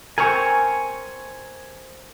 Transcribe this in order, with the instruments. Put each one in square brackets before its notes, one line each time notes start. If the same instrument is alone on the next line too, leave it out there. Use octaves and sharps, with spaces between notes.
[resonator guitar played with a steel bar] C4 A#4 [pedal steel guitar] G#5 C#6